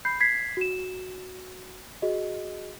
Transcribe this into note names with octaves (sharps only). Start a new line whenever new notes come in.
B5 G6 C7
G#6 B6 C7
F#4 E7
F#4 G#4 D#5